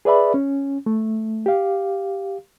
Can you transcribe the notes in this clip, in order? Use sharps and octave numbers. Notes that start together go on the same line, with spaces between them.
G#4 B4 D5 E5 B5
C#4
A3
G4 F5